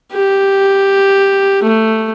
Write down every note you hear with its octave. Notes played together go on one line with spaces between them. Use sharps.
G4
A3